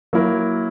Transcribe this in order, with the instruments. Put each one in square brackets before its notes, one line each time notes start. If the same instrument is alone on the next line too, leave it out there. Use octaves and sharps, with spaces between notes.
[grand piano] F#3 A#3 E4 A#4